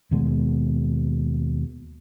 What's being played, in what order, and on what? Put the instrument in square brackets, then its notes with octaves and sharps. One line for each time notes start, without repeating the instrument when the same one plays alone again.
[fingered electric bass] D#2 B2 G#3